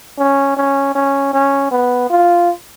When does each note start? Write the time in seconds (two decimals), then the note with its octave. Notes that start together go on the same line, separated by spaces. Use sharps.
0.18 C#4
0.57 C#4
0.95 C#4
1.33 C#4
1.72 B3
2.10 F4